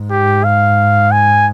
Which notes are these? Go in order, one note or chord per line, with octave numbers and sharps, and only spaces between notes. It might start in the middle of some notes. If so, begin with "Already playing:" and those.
Already playing: G#2
G4
F5
G#5